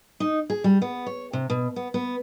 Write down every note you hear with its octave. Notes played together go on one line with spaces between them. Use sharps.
D#4
G#4
G3
B3
C#5
C3
B2
B3
B3